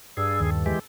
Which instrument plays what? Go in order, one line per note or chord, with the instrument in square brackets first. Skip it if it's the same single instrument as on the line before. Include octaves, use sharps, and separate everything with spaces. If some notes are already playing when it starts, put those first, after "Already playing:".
[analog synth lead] G2 [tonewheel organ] G#4 [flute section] D5 E6
[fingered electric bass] D#2 [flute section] A4
[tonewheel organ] E3 G#3 G4